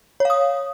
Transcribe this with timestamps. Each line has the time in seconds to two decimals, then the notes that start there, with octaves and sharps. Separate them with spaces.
0.20 C#5
0.25 F5
0.30 D#6